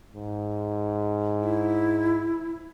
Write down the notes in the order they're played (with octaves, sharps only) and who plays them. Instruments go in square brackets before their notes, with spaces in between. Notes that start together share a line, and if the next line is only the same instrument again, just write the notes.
[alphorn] G#2
[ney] E4